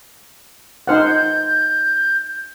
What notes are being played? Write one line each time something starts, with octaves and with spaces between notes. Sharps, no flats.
D#4 C5 F#5 F6
G6